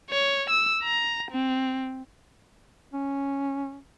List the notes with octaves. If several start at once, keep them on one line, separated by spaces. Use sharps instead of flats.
C#5
E6
A#5
C4
C#4